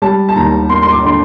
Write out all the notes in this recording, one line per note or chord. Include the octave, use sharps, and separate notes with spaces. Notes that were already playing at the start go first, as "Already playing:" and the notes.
G3 A5
A5
D#2 A#5
A#3 C6
C6
D6
D3 C6